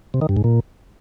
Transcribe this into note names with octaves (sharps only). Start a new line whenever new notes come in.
C3
D#3
G2
G#2
A#2